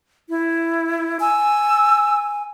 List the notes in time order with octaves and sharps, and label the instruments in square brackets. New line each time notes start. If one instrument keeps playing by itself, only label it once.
[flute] E4
[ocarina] G#5 [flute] E6